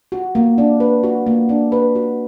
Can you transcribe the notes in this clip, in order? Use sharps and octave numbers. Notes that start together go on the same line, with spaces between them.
F#4
A#3
D4
B4
F#4
A#3
D4
B4
F#4